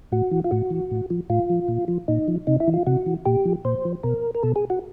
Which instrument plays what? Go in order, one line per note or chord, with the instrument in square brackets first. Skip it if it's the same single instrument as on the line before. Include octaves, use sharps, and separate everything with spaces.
[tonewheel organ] A2 F#4
E3
F4
A2 F#4
E3
A2
F3
A2 F4
F3
A#2
F3
A#2 D#4
F3
C3 D#4
E4
E3
F4
C3 F#4
E3
A#2 G4
F3
A#2 C5
F3
B2 A#4
A#4
B2 A4
G#4
F#4